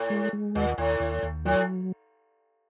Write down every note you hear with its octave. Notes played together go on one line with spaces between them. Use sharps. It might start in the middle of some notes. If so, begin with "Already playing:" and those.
Already playing: A2
G#3
G#3
D#2 A#2
D#2 A2
D#2
D#2
A2 F#3